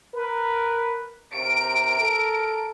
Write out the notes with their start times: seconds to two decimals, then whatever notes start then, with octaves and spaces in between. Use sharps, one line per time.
0.14 A#4 B4
1.35 C3 A#4 D7
2.00 A4